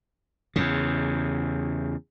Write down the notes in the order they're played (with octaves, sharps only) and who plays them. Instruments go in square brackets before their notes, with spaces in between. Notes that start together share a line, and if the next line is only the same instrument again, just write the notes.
[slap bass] E2 C#3